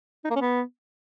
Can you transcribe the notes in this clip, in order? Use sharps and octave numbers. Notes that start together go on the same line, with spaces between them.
D#4
A#3
C#4
B3